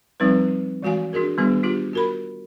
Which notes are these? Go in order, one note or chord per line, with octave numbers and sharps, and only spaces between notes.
F3 G3 C4 D#4 B4
E3 G#3 F#4 F5 G#5
D4 F#4 G#4 A#4
D#3 G3 B3 D4 G#4
D4 F4 G4
F#4 A#4 B5